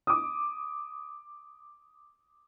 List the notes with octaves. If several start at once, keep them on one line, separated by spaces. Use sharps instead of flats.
D6 D#6